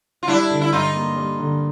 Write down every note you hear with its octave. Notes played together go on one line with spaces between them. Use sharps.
F4
G3 D4 E4
D3
E4
G2 D#4 F4
A#3
G3
D3